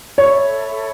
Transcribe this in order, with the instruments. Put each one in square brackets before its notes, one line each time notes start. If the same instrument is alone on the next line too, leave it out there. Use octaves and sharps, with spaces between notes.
[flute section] A4 E5 B5 [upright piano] C#5